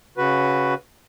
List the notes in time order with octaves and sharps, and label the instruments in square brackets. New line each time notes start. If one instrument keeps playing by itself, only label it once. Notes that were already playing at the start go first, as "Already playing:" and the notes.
[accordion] C#3 F#4 B4